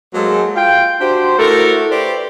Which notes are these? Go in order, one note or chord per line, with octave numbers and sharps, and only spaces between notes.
F#3 G#3 A#3 G#4 A4 C5
F4 G5
D4 F#4 G4 C5
A3 E4 F#4 A4 A#4
G4 B4 C5 D5